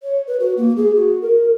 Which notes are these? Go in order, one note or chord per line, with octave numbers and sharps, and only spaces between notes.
C#5
B4
F#4
A#3
G#4
F#4
A#4